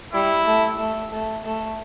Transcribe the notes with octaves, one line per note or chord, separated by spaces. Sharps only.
G3 E4
A3
A3
A3
A3